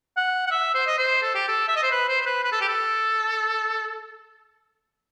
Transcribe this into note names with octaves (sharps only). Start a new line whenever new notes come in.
F#5
F#5
E5
C5
D#5
C5
A4
G4
A4
E5
D#5
C5
B4
C5
C5
B4
B4
A4
G4
A4